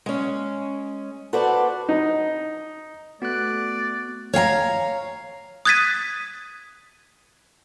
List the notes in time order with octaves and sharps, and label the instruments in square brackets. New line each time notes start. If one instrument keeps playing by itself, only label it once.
[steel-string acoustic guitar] G#3 C#4
F#4 A4 B4 C5 D5
[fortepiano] D#4
[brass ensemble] A3 [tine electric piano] B3 [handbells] F#4 F#6 [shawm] D5
[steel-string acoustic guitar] C#5 F5 G5 A#5
[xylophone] D#6 F#6 G#6 A6 B6 D#7